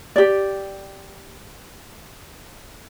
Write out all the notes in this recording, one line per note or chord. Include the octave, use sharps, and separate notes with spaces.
G4 D5